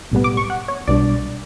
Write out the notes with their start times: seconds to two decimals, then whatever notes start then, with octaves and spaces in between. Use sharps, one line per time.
0.12 B1 A2 G3 B3
0.24 D6
0.37 C#6
0.50 F#5
0.68 C#5
0.87 B1 B2 G3 D4 D5